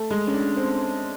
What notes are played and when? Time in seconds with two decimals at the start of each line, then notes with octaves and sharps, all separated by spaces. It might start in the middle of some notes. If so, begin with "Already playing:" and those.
Already playing: A3
0.11 G#3
0.27 C#4
0.33 D4
0.57 C4